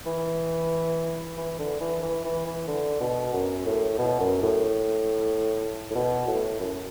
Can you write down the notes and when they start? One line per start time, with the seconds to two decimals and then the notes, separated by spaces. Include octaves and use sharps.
0.06 E3
1.37 E3
1.59 D3
1.80 E3
2.02 E3
2.24 E3
2.46 E3
2.68 D3
3.00 B2
3.34 F#2
3.66 A2
3.98 B2
4.20 F#2
4.42 A2
5.90 A2
5.95 B2
6.28 A2
6.60 F#2